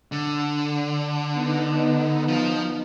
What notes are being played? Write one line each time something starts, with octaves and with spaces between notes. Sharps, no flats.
D3
B3 D#4
F3 F4